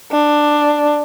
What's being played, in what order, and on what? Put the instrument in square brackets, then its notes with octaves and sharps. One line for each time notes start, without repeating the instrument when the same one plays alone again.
[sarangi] D4